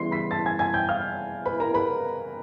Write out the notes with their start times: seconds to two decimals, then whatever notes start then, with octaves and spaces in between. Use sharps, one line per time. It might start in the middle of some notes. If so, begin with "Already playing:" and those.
Already playing: C#3 E3 G3 B3 E4 C6 C7
0.11 B5 B6
0.31 A5 A6
0.46 G#5 G#6
0.59 G#5 G#6
0.74 G5 G6
0.89 F5 F6
1.46 B4 B5
1.60 A#4 A#5
1.74 B4 B5